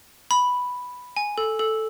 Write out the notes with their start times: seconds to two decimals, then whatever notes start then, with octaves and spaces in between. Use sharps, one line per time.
0.31 B5
1.16 G#5
1.38 A4
1.59 A4